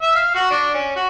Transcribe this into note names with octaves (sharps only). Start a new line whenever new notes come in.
E5
F5
F#4
D4
C#4
F#4